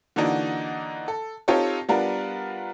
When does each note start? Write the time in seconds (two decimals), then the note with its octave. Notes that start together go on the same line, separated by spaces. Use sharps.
0.16 D3 E3 A#3 D4 D#4 F#4
1.08 A4
1.48 C4 D#4 F4 G4 A4 C#5
1.89 G3 B3 D4 F4 A#4